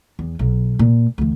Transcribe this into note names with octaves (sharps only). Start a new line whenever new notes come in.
E2
B1
A#2
D2 E3